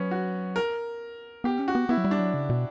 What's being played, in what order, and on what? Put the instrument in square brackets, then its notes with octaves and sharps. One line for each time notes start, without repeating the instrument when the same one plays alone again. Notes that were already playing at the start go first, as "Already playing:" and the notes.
Already playing: [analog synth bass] F#3 [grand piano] B3 C#4
[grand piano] F#4
A#4
[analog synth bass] B3 [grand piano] G4
[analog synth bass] C#4
[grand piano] F#4
[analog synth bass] B3
[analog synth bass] B3 [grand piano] E4
[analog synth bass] F#3
G3
[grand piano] D4
[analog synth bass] F#3
C#3
B2